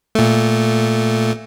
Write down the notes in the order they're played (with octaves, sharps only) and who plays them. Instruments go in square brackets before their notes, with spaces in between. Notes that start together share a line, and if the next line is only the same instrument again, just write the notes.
[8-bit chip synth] A#2 A3